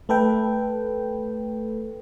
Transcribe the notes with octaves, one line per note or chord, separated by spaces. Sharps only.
A3 A4 B4 G5